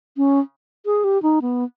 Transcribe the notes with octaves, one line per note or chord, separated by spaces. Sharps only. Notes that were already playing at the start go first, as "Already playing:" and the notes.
C#4
G#4
G4
D#4
B3